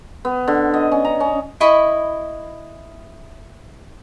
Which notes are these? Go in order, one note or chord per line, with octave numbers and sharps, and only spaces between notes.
B3
D3
D#5
C#4
A#5
C#4
E4 D#5 B5 C#6